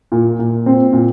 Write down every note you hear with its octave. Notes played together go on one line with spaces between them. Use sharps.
A#2
A#2
C4
A#2